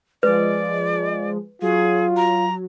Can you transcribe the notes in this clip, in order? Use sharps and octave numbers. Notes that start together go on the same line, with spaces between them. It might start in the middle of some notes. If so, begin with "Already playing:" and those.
F3 G#3 B4 D5
F#3 F4 G#4
A#5